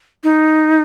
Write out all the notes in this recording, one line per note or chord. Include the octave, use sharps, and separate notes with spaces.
D#4